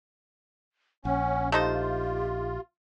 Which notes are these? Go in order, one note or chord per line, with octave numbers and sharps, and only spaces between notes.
A#1 C#4 F#5
A3 D#4 F4 G4 C5